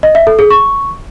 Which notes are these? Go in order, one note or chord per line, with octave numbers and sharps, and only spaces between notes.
D#5
E5
A4
G#4
C#6